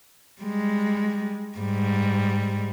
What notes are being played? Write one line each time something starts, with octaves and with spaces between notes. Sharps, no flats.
G3 G#3
G#2 G3